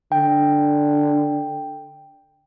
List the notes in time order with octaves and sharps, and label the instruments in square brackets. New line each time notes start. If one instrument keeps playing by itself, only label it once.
[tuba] D3 [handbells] G5